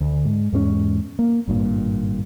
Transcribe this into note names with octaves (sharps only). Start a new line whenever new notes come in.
D2
G#2
E2 G#2 A3 C#4
A#3
G#1 G2 A#2